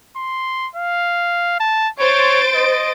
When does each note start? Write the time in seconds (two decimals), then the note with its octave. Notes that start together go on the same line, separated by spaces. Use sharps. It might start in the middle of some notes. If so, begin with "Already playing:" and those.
0.16 C6
0.76 F5
1.60 A5
2.00 C5 C#5 A6 D7
2.55 D#5